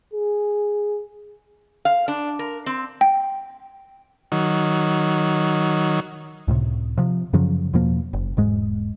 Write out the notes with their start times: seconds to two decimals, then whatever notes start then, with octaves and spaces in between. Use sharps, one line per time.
0.13 G#4
1.85 F5
2.08 D4
2.39 A#4
2.66 C4
3.01 G5
4.32 D#3 F#3
6.48 C#2 A2 C3
6.98 C3 F3
7.33 F#2 C#3 F3 F#3
7.73 E2 B2 F3 A#3
8.13 F#1
8.37 E1 G#2 G#3